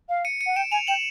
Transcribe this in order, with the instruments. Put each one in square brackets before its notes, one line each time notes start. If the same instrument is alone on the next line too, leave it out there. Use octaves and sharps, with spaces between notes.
[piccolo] F5
[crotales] C#7 D#7
C#7 D#7
[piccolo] F#5
[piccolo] G5 [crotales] D7 E7
[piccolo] G#5 [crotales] D#7 F7
[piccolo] G5 [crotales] E7 F#7